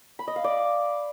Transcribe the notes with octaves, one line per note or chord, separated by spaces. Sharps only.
B5
D#5
F5
D5